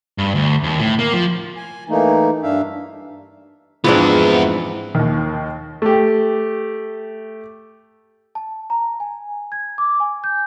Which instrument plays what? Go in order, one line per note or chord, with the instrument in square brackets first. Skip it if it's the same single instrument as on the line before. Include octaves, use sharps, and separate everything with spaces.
[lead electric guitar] G2
D2
D#2
A2
A#3
F3
[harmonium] G#5
E3 A3 A#3 D#4
G2 D4 E5 F5
[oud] F2 G#2 D4 [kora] E3 C4 [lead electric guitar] B3 E4 [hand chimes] F4
[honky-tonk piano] D#2 D#3
[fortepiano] A3 G4
[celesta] A5
A#5
G#5
G#6
D6
G#5
G6